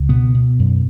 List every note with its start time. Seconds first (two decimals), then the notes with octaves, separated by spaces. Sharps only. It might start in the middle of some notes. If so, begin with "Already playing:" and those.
Already playing: C#2
0.09 B2 B3
0.34 B2
0.59 F#2